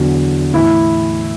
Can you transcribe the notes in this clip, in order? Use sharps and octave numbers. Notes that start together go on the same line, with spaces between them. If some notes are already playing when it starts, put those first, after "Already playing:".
Already playing: E2 D3 F#3
A2 E3 E4